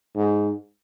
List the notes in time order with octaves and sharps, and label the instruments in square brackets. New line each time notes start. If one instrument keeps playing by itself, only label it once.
[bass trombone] G#2